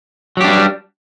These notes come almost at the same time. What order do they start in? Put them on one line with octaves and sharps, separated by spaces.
F#3 G4 D4 G3